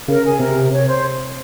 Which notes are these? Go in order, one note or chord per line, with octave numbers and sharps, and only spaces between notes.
C#3 A#4
G#4
C3 A#4
C#5
C5